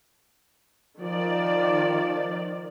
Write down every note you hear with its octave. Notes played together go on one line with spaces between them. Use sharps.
D#3 F3 D5